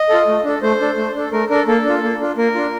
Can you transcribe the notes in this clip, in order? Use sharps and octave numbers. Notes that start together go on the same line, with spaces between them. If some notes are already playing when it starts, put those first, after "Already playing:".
Already playing: D#5
F4 A4
A3
D4 A4
A3 C5
D4 A4
A3
D4 A4
A3 A#4
D4 A4 A#4
A#3 A4
D4 F4
A#3
D4 F4
A#3 A#4
D4 F4